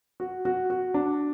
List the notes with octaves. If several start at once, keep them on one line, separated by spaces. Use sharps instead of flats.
F#4
F#4
F#4
D4